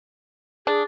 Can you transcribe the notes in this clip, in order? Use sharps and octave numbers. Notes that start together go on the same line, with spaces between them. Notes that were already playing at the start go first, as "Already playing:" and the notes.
D4 G#4